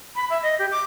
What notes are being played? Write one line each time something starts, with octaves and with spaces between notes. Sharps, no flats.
B5
E5
D#5
G4
D6